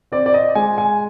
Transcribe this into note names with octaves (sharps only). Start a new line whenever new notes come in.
C4 D5
D5
D#5
G#3 G#5
G#5